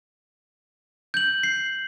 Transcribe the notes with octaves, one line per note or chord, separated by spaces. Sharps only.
G6 F#7
C7